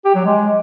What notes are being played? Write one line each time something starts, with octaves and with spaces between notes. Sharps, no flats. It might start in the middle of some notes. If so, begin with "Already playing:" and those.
G4
F#3
G#3